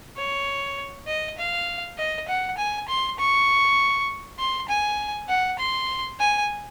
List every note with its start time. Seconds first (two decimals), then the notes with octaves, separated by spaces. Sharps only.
0.17 C#5
1.08 D#5
1.38 F5
1.98 D#5
2.29 F#5
2.58 G#5
2.89 C6
3.19 C#6
4.39 C6
4.69 G#5
5.29 F#5
5.59 C6
6.20 G#5